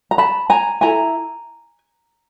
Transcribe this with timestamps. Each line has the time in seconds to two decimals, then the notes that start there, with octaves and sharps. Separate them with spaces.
0.11 A#5
0.18 A5 B5
0.50 G#5 A#5
0.81 E4 A4 G#5 A#5